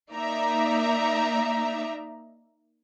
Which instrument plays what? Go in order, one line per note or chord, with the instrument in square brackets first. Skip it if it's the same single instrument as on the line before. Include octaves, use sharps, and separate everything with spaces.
[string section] A#3 D#4 D5 E5 A#5